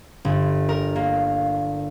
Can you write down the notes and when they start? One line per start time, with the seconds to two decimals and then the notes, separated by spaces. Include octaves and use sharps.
0.25 G1
0.69 A#4
0.96 A#3